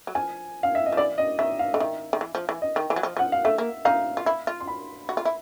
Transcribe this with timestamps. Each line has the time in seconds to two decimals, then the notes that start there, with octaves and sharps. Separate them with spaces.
0.07 F#3
0.15 F3 G#5
0.63 F5
0.75 E5
0.86 D#5
0.93 F3
0.97 E3 D5
1.18 D#5
1.39 D#3 E5
1.59 F5
1.73 D3 D#5
1.80 D#3 E5
2.13 D#3
2.21 E3
2.35 F3
2.49 E3
2.62 D#5
2.76 D#3
2.90 E3
2.96 F#3
3.03 F3
3.17 F3 F#5
3.32 F5
3.45 A3 E5
3.58 A#3
3.85 D#4 F5
4.17 F4
4.26 E4
4.47 F4
4.60 C6
4.68 B5
5.09 F#4
5.17 F4
5.25 E4